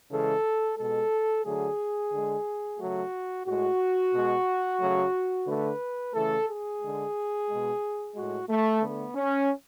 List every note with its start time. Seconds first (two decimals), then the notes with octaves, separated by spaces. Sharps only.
0.10 C#3 E3 G#3 A4
0.78 B2 G#3 A4
1.45 D3 F#3 A3 G#4
2.12 D3 G#3
2.78 C#3 F#3 A3 F#4
3.45 A2 G#3 F#4
4.12 B2 G#3
4.79 C#3 F#3 A3
5.47 D3 A3 B4
6.14 C#3 E3 A3 A4
6.48 G#4
6.81 D3 G#3
7.48 B2 G#3
8.15 A2 G#3 F#4
8.49 A3
8.82 D3 A3 B3
9.15 C#4